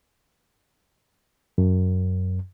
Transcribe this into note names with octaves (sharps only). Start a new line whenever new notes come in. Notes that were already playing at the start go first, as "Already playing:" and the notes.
F#2